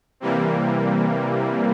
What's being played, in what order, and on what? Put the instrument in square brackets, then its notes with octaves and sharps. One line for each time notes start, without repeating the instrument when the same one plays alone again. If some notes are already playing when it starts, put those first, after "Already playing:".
[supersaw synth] C3 E3 G3 A#3